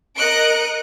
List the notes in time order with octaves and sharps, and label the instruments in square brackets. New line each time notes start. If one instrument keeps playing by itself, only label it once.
[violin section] A#4 D#5 F#6 C#7 D7